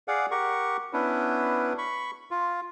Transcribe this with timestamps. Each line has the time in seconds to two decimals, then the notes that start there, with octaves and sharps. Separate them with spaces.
0.08 G#4 D5 F5 F#5
0.31 G4 A#4 F#5 C#6
0.93 B3 C#4 D4 E4 B4
1.78 B5 C#6
2.31 F4